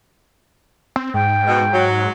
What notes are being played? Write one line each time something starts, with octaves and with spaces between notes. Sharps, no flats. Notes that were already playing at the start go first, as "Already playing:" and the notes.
C4
G#2 G5
B2
F#3